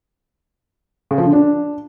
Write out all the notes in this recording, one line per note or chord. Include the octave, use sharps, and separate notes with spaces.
C#3
F3
D3
D4